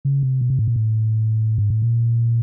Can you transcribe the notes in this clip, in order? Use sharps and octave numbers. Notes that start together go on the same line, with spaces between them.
C#3
C3
B2
C3
A2
A#2
A2
G#2
A2
A#2